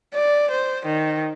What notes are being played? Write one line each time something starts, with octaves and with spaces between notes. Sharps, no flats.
D5
C5
D#3